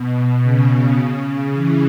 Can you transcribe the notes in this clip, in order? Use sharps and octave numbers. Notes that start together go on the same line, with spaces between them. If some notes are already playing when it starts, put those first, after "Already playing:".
Already playing: B2
C#3
E3